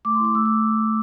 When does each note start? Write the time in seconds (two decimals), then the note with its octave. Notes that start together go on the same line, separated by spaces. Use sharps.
0.05 A3 D6
0.15 C6
0.19 E4
0.25 D6
0.35 A3 E6
0.45 D6